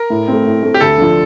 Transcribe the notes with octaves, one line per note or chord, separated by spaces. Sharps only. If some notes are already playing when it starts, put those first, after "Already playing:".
Already playing: A#4
A2
A3 C4
A2
A3 C4
G4
D2 A4
D3 F3